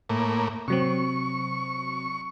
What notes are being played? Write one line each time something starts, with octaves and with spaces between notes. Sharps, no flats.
A2 A#3
C3 F#3 C4 C#6